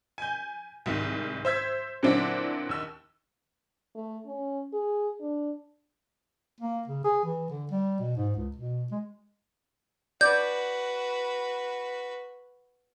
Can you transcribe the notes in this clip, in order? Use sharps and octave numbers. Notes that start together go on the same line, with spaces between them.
G#5 G6
C2 G#2 D#3
C5 E5 E6 G#6 B6
A#2 D3 F#3 C4 D4 E4
D#2 E6
A3
C#4
G#4
D4
A#3
C#3
G#4
E3
D3
G3
B2
G#2
C#2
B2
G#3
F#4 B4 D5 G6